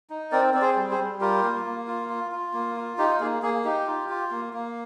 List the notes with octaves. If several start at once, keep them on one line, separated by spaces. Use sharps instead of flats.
D#4
C4 A#4 D5
C4 D5
G#4 C5
G3
G#4 C5
G3
F4 G4 A#4
A#3
A#3
F4
F4
F4
A#3
F4
D#4 G4
A#3 G#4
A#3 G#4
D#4 G4
F4
F4
A#3
A#3